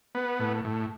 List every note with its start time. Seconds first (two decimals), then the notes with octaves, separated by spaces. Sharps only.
0.15 B3
0.40 A2
0.65 A2